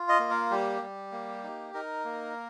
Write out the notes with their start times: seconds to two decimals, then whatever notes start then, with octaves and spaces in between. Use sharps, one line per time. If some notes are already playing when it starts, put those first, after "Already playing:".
Already playing: F4
0.09 D#5
0.19 A#3
0.30 A#4
0.51 G3 G4
0.82 G3
1.12 A#3
1.43 D#4
1.74 D#4 A#4
2.05 A#3